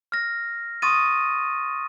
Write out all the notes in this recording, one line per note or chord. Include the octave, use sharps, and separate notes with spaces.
F6 A#6
C6 C#6 D#6 A6 D#7